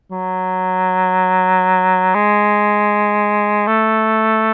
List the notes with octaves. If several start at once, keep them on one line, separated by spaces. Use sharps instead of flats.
F#3
G#3
A3